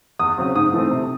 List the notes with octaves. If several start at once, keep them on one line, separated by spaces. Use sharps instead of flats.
E2 D#6
C#3 F#3 C4
G#2 D#6
E3 A3 C4
C3